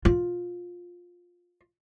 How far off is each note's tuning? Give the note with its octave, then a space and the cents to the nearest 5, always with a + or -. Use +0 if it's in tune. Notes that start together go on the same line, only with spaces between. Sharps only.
F4 +15